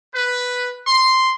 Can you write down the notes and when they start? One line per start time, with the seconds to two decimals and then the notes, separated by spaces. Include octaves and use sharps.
0.14 B4
0.86 C6